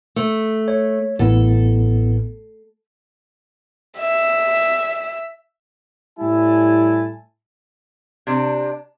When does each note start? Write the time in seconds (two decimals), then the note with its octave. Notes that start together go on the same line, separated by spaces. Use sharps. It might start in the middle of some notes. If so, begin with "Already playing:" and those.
0.16 A3
0.68 C#5
1.19 A1 A2 B3 A4
3.98 E5
6.20 A2 G3 E4 G#5 A5
8.27 C3 D4